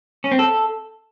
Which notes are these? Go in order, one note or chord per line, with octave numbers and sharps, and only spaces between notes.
C#4
C4
A4